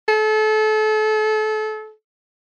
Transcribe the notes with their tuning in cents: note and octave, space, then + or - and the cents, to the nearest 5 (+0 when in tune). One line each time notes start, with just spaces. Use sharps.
A4 -30